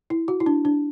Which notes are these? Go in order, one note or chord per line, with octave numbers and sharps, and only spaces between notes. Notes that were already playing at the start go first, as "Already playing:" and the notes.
E4
F#4
E4
D4
D4